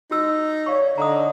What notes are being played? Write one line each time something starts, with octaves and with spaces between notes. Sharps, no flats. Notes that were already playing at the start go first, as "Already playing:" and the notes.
D#4 F#4 E6
C#5 D5 F5 C#6
D3 D#5 A#5 D#6